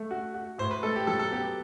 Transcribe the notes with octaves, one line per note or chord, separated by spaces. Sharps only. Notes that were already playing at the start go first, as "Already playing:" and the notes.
Already playing: A3
F#4
F#4
A2 C5
B4
A3 A4
G4
F#3 A4
A4
B3 G4
G4